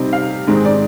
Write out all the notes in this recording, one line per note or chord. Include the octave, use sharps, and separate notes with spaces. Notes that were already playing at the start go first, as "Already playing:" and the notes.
Already playing: C3 G3 C4 D#4
F5
G#2 D#3 G#3 C4 D#4
D5